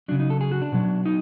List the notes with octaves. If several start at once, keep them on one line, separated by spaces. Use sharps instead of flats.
C#3 F#3 D4
D#4
A4
G#4
F#4
D4
B2 F#3
D#4